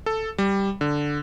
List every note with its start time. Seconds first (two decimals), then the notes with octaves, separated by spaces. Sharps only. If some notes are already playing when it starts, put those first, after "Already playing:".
0.06 A4
0.38 G3
0.81 D3